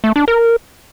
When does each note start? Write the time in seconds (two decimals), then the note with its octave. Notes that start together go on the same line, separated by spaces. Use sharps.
0.04 A3
0.16 D4
0.28 A#4